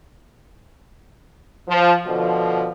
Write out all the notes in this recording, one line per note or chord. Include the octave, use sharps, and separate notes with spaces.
F3
B2 D3 F3